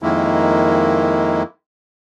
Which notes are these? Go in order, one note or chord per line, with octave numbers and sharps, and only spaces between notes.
F2 D#3 G#3 A#3 E4